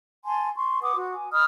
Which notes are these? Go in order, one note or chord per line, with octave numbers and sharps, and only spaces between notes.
G#5 A5 C6
C6 C#6
B4 F#5 D6 D#6
F#4
G#5
D#5 B5 D#6 F6